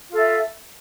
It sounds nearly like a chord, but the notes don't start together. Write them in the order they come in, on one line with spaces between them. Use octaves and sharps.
F4 A4 E5